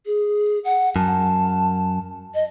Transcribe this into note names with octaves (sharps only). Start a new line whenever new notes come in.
G#4
F#5
F#2 A5
D#5